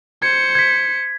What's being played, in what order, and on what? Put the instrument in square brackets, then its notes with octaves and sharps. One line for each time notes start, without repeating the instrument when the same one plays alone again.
[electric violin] C5 C#7 [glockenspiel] G#6
[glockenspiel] G#6 B6